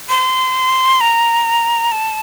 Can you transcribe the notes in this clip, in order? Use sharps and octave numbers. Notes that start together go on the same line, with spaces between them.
C6
A#5
A5